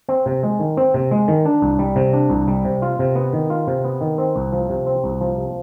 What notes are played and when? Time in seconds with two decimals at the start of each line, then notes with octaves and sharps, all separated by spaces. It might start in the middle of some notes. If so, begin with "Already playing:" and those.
0.09 C4
0.26 C3
0.43 G#3
0.59 D#3
0.77 C4
0.94 C3
1.11 G#3
1.28 D#3
1.45 D4
1.62 C2
1.79 G3
1.96 C3
2.13 D4
2.30 C2
2.48 G3
2.65 C3
2.82 F4
2.99 C3
3.15 B3
3.33 D#3
3.50 F4
3.67 C3
3.85 B3
4.01 D#3
4.18 C4
4.36 C2
4.52 F3
4.69 C3
4.86 C4
5.04 C2
5.21 F3
5.38 C3